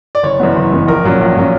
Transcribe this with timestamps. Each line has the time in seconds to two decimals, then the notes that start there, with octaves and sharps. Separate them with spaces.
0.15 D5
0.23 F#1 C#5
0.40 F#2 E3 B3
0.56 F#1
0.72 F#2 E3 B3
0.88 A#1 A#4
1.04 A#2 F#3 C#4
1.20 A#1
1.37 A#2 F#3 C#4